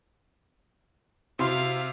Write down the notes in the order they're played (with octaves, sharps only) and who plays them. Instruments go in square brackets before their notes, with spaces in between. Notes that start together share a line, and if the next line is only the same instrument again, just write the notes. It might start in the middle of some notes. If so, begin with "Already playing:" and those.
[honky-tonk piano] C3 C6 [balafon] E4 F#4 [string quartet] F5